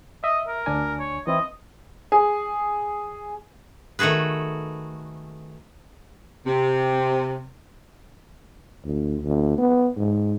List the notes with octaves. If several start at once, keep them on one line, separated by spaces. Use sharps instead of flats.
D#5 E5
A#4
D2 D4 G#5
C#5
E3 C4 E4 D#5
G#4
D#3 A3 F#4 G#4 B4
C3
D2
D2
B3
G#2